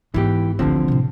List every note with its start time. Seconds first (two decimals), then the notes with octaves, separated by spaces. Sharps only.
0.14 G#2 E3 B3 G4
0.59 A1 D2 D3 F3 C4
0.88 A2 C3